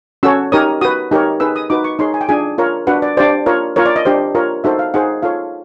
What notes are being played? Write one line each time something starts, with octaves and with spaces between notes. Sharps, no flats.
C#4 F#4 A4 C#5 E6
D#4 G4 A#4 C#5 D#6
F#4 B4 D#6
D#4 G4 A#4 C#5
D#4 G#4 B4 E6
D#6
D#4 F#4 B4 D6
C#6
D#4 G#4 C#5 C6
G#5
G5
D4 F4 G#4 G#5
F4 A#4 C#5
D4 F#4 B4 F#5
D5
D4 G4 C5 D5
F4 A#4 C#5
F4 A#4 C#5
D5
D#5
D4 G4 C5
F4 A#4 C#5
D#4 F#4 A4 C5 E5
F5
D#4 G#4 C5 F#5
F4 A4 C#5 F5